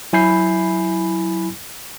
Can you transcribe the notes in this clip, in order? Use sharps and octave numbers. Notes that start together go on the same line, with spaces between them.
F#3 E4 G#5 B5 G6 C7